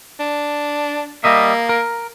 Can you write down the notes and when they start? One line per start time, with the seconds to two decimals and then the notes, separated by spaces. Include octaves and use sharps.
0.20 D4
1.24 G3 A#3 D#5 E5
1.69 A#4